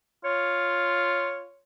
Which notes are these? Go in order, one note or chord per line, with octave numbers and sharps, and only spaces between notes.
F4 C#5